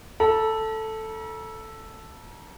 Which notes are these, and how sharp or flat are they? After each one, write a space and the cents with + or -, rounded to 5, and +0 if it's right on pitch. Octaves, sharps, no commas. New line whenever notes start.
A4 +0 A#5 +45